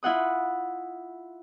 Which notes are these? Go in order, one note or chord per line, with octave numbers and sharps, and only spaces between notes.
E4 F4 F#5 D#6